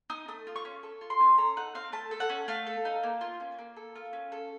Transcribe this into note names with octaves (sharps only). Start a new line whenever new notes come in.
D#4 D#6
A3 D#6
F4
C#6
C#4
A4
F4
C6
C#4
A4 A#5
D#4 F#5
C4 F5
A3 A5
A4
F#5
C#4
A3 F5
A4
D#4
A#3
F4
C#4
A#3
A4
F4
C#4
A4